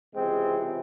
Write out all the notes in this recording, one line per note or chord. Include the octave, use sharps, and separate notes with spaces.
C#2 C3 E3 G#3 C4